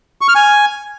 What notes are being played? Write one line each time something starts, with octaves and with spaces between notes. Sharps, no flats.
C#6
F6
G#5